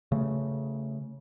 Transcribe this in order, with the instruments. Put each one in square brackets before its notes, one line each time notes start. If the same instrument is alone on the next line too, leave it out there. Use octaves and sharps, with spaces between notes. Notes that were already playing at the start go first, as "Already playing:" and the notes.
[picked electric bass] C#3 A3